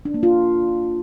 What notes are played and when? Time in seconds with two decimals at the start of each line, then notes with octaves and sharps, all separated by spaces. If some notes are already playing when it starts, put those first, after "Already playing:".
0.05 D4
0.14 A#3
0.23 F4